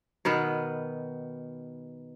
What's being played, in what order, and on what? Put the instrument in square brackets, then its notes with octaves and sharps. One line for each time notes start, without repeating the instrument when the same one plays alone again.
[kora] B2 D#3 B3